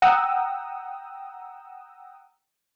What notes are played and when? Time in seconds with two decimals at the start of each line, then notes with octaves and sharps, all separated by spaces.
0.02 F#5 G5 A#5 D#6 E6